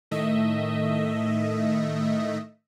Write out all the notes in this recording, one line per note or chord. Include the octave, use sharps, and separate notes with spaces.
A2 D#3 A3 D#5 E5